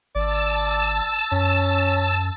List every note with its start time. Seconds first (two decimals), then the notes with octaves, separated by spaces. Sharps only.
0.15 G#1 D5 A5 E6
1.32 F#2 C#4